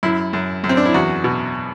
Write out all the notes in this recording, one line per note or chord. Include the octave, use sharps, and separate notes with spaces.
F#2 E4
F#2
F#2
C4
D4
E4
E2 F#4
B2